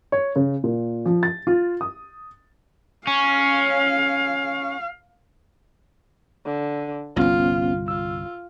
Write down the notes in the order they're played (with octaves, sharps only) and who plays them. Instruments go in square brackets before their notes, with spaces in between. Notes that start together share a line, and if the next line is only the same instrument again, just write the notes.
[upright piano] C#5
C#3
A#2
F3
A6
F4
D#6
[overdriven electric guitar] C#4 [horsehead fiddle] F5
[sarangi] D3
[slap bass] G1 C2 [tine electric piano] B3 C#4 [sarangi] F4
[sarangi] F4 [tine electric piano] E6